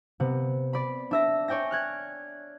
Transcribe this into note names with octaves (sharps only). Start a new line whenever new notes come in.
C3 B3
D5 B5
D4 E5 A#6
C#5 D5 G5 G#5 A#6
F6 F#6 G#6